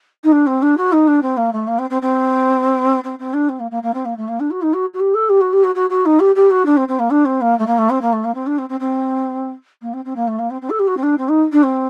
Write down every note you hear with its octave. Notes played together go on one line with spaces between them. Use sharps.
D#4
D4
C4
D4
F#4
D#4
D4
C4
A#3
A3
A#3
C4
C4
C4
C4
C4
D4
C4
A#3
A#3
A#3
C4
A#3
A3
A#3
D4
F#4
D#4
F#4
F#4
G4
A4
G4
F#4
G4
F#4
F#4
F#4
D#4
G4
G4
F#4
D4
C4
C4
A#3
D4
C4
A#3
A3
A#3
A3
C4
A#3
A3
A#3
C4
D4
C4
C4
C4
A#3
C4
C4
A#3
A3
A#3
C4
C4
A4
G4
F#4
C4
D4
C4
D#4
D4
C4